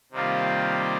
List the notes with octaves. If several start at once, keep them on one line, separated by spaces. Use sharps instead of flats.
C3 D#3 G3 A#3 F4